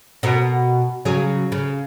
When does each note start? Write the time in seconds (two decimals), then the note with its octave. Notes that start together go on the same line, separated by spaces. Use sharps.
0.23 B2 A#4
1.05 C#3 F#3 G#4
1.52 C#3